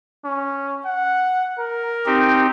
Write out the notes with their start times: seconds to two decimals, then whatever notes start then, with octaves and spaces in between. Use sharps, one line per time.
0.25 C#4
0.85 F#5
1.59 A#4
2.06 C4 D#4 G4